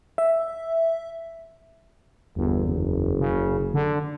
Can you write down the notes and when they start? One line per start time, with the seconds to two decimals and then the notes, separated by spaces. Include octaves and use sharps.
0.18 E5
2.36 G1 E2
2.67 F#1
3.20 C#3
3.74 D3